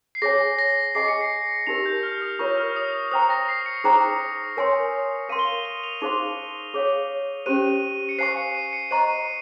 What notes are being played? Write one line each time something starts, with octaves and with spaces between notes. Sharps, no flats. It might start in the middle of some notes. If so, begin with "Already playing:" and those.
C7
G#4 C#5 G#5 A#6
A#6
G#4 D#5 G#5 C#6 C7
C#7
C7
D#4 G4 A#4 F7
G6
F6
D#6
F4 A#4 C#5 C#6
F6
D#6
C5 G5 A#5 D#6
A#6
C7
C#7
D#4 G#4 C5 G5 A#5
A#4 C#5 G#5 C6
A#4 F5 C6 D#7
G7
F7
G7
F7
D#4 G#4 C5 F5 C6 F7
G#4 C#5 F5
C#4 G4 C5 D#7
C#7
C5 F5 G#5 C#6 C7
C#7
D#7
C#7
C5 D#5 A#5 C#6 D#7
D#7